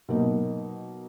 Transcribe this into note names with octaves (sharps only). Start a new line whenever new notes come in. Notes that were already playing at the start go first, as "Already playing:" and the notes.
B2 F#3 A#3 D#4